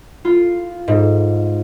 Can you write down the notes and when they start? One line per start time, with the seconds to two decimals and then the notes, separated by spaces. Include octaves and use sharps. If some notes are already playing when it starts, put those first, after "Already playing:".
0.25 F4
0.88 G#2